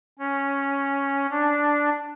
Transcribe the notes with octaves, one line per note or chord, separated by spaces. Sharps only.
C#4
D4